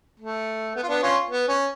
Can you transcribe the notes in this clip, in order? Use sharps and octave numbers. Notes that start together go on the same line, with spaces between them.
A3
B3
F4
B3 D4
C#4 F4
B3
C#4